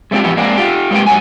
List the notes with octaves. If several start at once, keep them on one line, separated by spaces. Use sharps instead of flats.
G#3 A3 C4 D4 F4 G4
A2 E3 F3 B3 G4
G#3 A#3 C4 D4
F4 G4
G#3 A#3 C4 G4 B4 G5
G#2 F#3 F#5 G#5